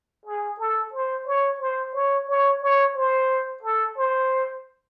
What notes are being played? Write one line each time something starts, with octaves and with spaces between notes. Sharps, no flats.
G#4
A4
C5
C#5
C5
C#5
C#5
C#5
C5
A4
C5